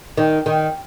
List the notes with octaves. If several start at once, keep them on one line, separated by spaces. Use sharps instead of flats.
D#3
D#3